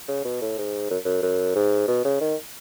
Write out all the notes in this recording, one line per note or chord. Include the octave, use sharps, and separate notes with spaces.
C#3
B2
A2
G#2
F#2
F#2
F#2
G#2
B2
C#3
D#3